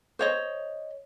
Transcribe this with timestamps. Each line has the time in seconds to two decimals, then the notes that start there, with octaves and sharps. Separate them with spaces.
0.19 C5 C#5 D#5